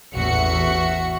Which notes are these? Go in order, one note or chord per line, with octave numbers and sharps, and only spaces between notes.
A1 E2 F#4 E5 C#7